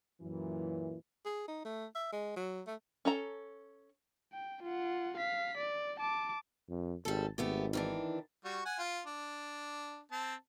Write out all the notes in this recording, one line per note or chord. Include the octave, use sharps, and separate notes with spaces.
F#2 A#2 E3
G#4
D#4
A3
E5
G#3
F#3
A3
C#4 A4 A#5
G5
F4 F#5
F5 B6
D5
A5 D6
F2
G#1 G3 A4
G#1 A3 B3 G4
D#3 E3 D4
G3 F#4 C#6
F#5 G#5
F4
D4
C4 A5